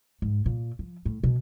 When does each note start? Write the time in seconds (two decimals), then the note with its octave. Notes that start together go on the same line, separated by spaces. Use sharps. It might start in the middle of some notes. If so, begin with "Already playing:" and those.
0.22 G#2
0.46 A#2
0.79 F3
1.06 A2
1.23 B2